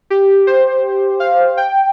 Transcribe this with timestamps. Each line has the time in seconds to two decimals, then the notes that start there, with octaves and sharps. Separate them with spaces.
0.10 G4
0.47 C5
1.20 F5
1.57 G5